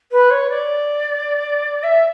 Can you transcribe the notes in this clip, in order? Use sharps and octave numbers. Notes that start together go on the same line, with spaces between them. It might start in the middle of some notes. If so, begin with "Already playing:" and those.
B4
C#5
D5
E5